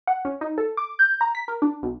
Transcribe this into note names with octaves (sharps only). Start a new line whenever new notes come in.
F#5
C#4
D#4
A4
D6
G6
A#5
B6
A#4
D4
B1